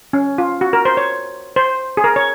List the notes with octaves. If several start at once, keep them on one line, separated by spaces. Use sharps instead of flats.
C#4
F4
F#4
A#4
C5
C#5
C5
G#4
A#4
C#5